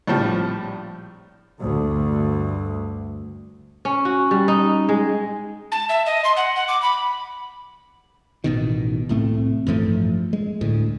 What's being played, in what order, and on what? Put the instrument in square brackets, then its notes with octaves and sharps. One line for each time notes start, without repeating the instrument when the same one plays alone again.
[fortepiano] A#1 A2 F3 G3
[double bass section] D2 G2
[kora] C#4
F#4
G3
D#4
G#3
[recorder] A5
E5
D#5
C6
F#5
F#5
D6
B5
[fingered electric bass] A1 B2 D#3
C2 A2 A3 C4
A1 G2 F3 A3
G#3
D2 A2